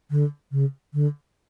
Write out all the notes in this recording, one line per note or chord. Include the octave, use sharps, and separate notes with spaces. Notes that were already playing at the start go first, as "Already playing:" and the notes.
D3
C#3
D3